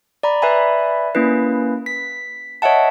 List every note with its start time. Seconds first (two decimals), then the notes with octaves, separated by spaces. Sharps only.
0.23 D5 A#5 B5
0.42 B4 D5 E5 G#5 B5
1.15 A#3 C#4 E4 B4
1.86 B6
2.62 C#5 D#5 E5 F#5 A5